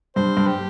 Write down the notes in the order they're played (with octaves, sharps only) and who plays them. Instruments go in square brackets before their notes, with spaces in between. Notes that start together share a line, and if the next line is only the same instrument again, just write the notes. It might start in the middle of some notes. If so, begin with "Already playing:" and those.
[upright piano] G2 [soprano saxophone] C5
[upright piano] G2
[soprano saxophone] G4